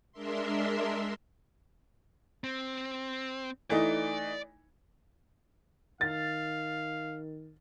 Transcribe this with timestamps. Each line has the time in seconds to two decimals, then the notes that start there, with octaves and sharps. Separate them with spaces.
0.12 G#3 D4 A#4 E5 C6
2.44 C4
3.70 E3 A3 D#4 D5
6.01 D#3 F5 A6